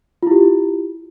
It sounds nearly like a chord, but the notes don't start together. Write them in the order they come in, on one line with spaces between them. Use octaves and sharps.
F4 E4 G4